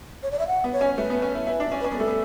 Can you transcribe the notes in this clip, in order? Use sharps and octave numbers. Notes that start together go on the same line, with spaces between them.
C#5
D5
E5
F#5
B3
C#5
C#4
A3 B4
B3
C#4
E4
E4 B4
D4
C#4
B4
C#4
B3 B4
A3 A4
B3